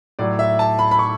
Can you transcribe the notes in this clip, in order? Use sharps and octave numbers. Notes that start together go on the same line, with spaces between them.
A2 F#3 D5
E5
A5
B5
B5
C#6